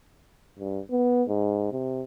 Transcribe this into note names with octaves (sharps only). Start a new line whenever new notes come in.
G2
B3
G#2
C3